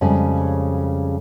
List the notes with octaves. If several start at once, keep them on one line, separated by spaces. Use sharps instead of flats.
F2 C#3 G3 G#3